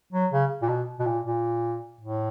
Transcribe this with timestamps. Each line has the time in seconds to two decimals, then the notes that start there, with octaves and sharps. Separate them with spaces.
0.13 F#3
0.32 C#3
0.62 A#2
0.69 B2
0.99 B2
1.06 A#2
1.25 A#2
2.01 A2